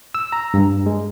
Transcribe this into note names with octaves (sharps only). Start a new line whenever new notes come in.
E6
A#5
G2
G#3